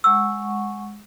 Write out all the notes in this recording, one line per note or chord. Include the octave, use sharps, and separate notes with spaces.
G#3 F#5 C#6 E6